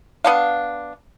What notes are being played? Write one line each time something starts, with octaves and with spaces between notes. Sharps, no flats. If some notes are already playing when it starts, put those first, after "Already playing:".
B3 D4 F5